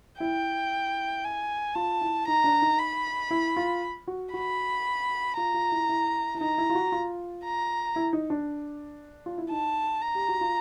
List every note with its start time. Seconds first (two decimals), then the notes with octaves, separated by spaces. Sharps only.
0.20 E4 G5
1.24 G#5
1.75 F4 A5
2.01 E4
2.28 D#4 A#5
2.44 D4
2.62 D#4
2.79 B5
3.31 E4
3.57 F4
4.07 F#4
4.34 F#4 B5
5.37 F4 A#5
5.54 F4
5.72 E4
5.89 E4
6.35 E4
6.41 D#4 A#5
6.58 E4
6.70 F4
6.75 F#4
6.92 F4
7.44 A#5
7.96 E4
8.13 D#4
8.30 D4
9.26 F4
9.38 E4
9.51 D#4 A5
10.02 A#5
10.15 G4
10.28 F#4
10.41 F4